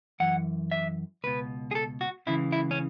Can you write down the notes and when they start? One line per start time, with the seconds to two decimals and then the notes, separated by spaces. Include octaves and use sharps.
0.20 F#2 E3 F#5
0.71 E5
1.24 C#2 B2 B4
1.71 G#4
1.75 A4
2.01 F#4
2.27 C#2 C#3 E3 E4
2.52 E4
2.71 C#4